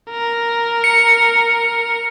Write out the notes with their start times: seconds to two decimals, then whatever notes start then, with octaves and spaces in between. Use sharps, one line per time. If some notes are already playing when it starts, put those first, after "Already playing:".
0.10 A#4
0.84 C#7